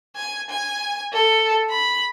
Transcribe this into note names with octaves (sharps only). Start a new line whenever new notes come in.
G#5
G#5
A4
B5